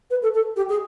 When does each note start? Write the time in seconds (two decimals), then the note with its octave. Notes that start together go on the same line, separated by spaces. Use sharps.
0.10 B4
0.23 A4
0.34 A4
0.56 G4
0.69 G#4